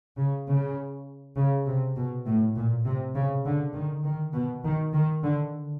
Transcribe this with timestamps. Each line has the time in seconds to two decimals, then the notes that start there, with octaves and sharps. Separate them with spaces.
0.18 C#3
0.47 C#3
1.37 C#3
1.67 C3
1.97 B2
2.26 A2
2.56 A#2
2.85 C3
3.15 C#3
3.46 D3
3.75 D#3
4.04 D#3
4.34 B2
4.64 D#3
4.94 D#3
5.24 D3